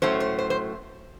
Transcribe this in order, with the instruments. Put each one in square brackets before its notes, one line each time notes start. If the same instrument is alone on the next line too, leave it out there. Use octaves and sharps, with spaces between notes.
[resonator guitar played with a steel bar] A2 F#3 A3 C#4 C5
C5
C5
C5